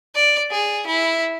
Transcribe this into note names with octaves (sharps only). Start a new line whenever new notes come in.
D5
G#4
E4